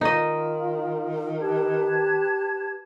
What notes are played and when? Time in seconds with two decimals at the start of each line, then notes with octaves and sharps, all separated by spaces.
0.01 D#3 D#4 F4 D#5
1.40 G4 B4 A5 G#6